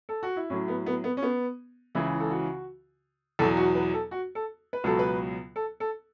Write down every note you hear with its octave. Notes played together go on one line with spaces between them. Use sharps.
A4
F#4
E4
A2 F#3 C#4
B3
B3
B3
C#4
B3
C#2 C#3 E3 E4
A4
F#4
E2 B2 F#3 A4
F#4
B4
A4
F#4
A4
B4
C#2 B2 F#3 A4
B4
A4
A4